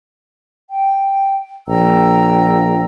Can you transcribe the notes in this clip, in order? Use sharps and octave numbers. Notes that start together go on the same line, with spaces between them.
G5
A#1 G5 A#5 E6